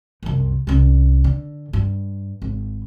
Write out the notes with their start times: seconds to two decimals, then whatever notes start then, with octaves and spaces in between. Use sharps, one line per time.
0.23 C2 F#2
0.67 C2 C#4
1.24 D3
1.73 G2
2.42 G#1